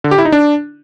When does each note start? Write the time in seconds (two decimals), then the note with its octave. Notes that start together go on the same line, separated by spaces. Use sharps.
0.04 D3
0.11 G4
0.18 E4
0.25 D#4
0.32 D4